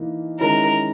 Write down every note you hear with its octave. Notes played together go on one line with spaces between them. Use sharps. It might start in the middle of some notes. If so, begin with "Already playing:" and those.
Already playing: E3 A#3 D#4
D#3 G#3 C#4 E4 A#4